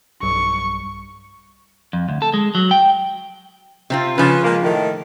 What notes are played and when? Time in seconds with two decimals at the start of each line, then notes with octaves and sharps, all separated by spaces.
0.23 B1 G2 G3 C#6
1.93 F2
2.09 D2
2.22 A4
2.34 G#3
2.55 F#3
2.71 G5
3.90 C3 C4 F4
4.18 C#3 F3 C#4 B4
4.44 G#3 A#3
4.63 A2 D#3